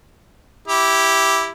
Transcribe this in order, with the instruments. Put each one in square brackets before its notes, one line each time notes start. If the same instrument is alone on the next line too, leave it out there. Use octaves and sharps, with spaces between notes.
[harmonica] E4 G4